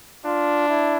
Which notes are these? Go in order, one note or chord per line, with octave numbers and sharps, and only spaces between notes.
D4 F4
E4